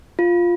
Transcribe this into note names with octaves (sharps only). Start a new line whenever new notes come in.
F4